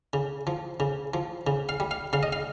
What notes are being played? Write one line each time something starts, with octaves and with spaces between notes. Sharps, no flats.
C#3
F3
C#3
F3
C#3
F5
G3
F5
C#3 F5
D#5
F5